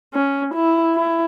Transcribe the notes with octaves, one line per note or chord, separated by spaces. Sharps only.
C#4
E4
E4